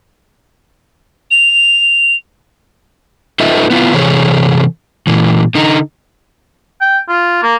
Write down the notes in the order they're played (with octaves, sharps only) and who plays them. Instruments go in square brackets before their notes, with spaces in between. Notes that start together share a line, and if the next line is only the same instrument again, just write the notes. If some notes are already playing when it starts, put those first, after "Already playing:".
[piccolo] F7
[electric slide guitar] D#4 F4 A4 B4 D#5 E5
B3 E4 F4
C3 E3 G#4 A4 C#5
A#2 E3
D3 D#4
[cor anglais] G5
F4
A#3